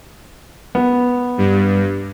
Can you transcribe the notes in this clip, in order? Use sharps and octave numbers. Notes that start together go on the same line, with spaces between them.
B3
G2